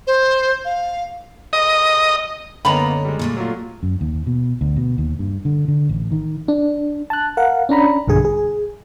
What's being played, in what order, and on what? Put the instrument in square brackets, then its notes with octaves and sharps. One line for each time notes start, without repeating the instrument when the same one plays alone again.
[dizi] C5
F5
[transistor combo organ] D#5
[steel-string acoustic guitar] F#2 D3 C#5 [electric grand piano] A#3 B3 [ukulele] D#5 A#5 B5
[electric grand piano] G3 G#3
[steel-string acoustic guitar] A#2 A3 A#3
[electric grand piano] F#3 F4
[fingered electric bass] F#2
D#2
B2
D2
B2
D#2
G2
D3
D3
A1
D#3
[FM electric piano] D4
A5 F#6
A#4 F5 F#5
C#4 D4 A#5 B5
B1 G2 D3 G#4 G#5
G#4